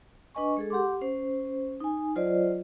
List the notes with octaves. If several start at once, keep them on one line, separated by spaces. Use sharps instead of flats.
D4 B4 D#5 G#5 C#6
G#3 G#4 A4
G4 F#5 C6 D6
C#4 C5
D#4 G#5
F#3 F4 C5 D5 D#5